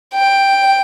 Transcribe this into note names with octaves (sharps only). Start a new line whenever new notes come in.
G5